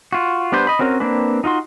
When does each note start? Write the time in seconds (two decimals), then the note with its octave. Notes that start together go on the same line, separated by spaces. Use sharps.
0.12 F4 F#4
0.52 G3 B3 D4 B4 C5
0.67 D#5 B5
0.79 C4 C#4 F#4 A#4
1.00 A#3 C4 D4 B4
1.44 D#4 F4 F#4 C6